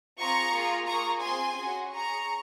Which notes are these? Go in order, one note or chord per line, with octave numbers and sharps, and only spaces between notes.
C4 F4 G#4 A#5 C#6
A#3 F4 G#4
A#3 F4 G#4 A#5 C#6
C4 F4 G#4 G#5 C6
C#4 F#4
C#4 G#4 A#5 C#6